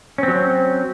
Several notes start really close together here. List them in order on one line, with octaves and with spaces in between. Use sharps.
C#4 C4 F#3